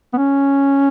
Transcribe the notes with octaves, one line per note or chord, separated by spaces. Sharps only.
B3
C#4